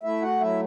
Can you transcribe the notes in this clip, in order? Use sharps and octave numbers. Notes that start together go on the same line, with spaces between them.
A3 E4 E5
F#4 F#5
F#3 E4 E5